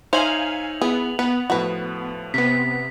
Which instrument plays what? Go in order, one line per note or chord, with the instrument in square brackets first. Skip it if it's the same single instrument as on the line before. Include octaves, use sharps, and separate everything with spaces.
[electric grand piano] D#4 C#5 E5 [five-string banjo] C5 [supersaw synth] F5 G#5 [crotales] F7 F#7
[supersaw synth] B3 [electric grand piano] E4 [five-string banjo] G#4
[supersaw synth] B3 [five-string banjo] B4 [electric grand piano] F#5
[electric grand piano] A2 F3 [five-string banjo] F#4 B4
[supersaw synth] C3 B3 [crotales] B6